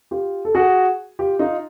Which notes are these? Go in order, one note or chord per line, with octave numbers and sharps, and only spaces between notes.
F4 G4
A4
F#4 G#4
F4 G4
D#4 F4